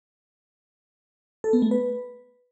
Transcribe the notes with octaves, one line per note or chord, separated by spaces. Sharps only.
A4
B3
A3
B4